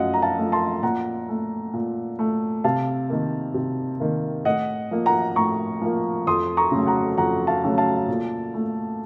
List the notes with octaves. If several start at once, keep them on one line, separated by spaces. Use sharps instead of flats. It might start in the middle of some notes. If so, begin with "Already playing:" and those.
Already playing: F#2 F3 A3 D#5 F5 F#5
A#5
F5 A5
F3 A3
A5 C6
A#2 F#5 A#5
A3
A#2
A3
C3 F5 A5
D#3 A#3
C3
D#3 A#3
A2 D#5 F#5
F3 A#3
F#5 A#5
A2 A#5 C#6
F3 A#3
F2 C6 D#6
A#5 C#6
C#3 F#3 A3
F#5 A#5
F2 F#5 A#5
F5 A5
C#3 F#3 A3
F5 A5
A#2
A3